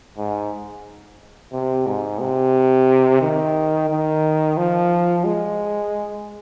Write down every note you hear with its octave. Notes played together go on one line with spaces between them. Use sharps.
G#2
C3
G#2
C3
D#3
D#3
F3
G#3